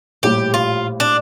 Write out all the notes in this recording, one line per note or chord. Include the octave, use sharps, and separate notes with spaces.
A#1 A2 G3 G4
F4
D4